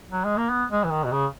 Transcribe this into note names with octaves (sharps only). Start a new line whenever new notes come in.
F#3
G#3
A#3
B3
G#3
E3
D#3
B2
C#3